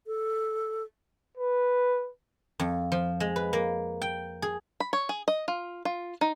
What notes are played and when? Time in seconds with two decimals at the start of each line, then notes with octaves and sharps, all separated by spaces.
0.07 A4
1.37 B4
2.60 F2
2.92 F3
3.20 G#3
3.36 B4
3.53 A#3
4.02 G5
4.42 G#4
4.80 B5
4.93 C#5
5.09 G#4
5.28 D#5
5.48 F4
5.85 F4
6.21 D#4